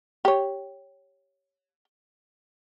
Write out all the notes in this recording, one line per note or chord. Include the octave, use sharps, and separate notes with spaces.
G4 C#5